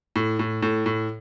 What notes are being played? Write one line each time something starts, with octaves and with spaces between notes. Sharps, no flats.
A2
A2
A2
A2